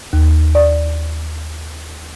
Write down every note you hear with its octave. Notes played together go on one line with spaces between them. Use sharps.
D#2
D5